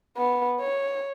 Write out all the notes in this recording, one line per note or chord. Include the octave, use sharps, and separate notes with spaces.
B3
C#5